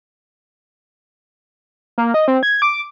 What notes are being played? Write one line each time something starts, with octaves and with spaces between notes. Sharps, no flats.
A#3
D#5
C4
G#6
D6